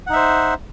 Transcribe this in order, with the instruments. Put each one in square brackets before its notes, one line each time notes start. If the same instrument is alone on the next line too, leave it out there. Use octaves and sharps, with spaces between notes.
[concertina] F#5
D#4
E5
C5